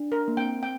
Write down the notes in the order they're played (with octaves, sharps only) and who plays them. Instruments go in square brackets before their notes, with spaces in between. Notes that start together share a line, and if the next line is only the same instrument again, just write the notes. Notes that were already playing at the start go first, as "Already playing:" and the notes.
Already playing: [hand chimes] D4
[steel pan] A#4
[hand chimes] A#3
[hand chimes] C4 [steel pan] G5
[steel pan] G5